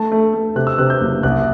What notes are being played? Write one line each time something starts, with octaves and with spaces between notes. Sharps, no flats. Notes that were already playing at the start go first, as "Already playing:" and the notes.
Already playing: A3 A5
A3
A3
C3 F#6
E6
C3 F#6
G6
F#1
C2 F#6